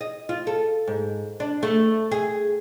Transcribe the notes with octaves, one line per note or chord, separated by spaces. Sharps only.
D#5
F4
A4
G#2
D4
A3
G#4